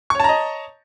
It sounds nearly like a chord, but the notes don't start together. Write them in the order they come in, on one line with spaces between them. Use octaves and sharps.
C#6 C#5 A5 A#5 D#5